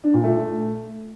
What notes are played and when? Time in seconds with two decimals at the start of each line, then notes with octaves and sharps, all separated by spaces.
0.04 D4
0.14 A#2
0.24 A3